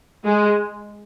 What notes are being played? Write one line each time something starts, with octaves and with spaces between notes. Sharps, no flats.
G#3